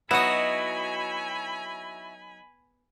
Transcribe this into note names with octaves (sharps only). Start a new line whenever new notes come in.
F#3 B3 D#4 E4 F#4 D#5 G#5 B5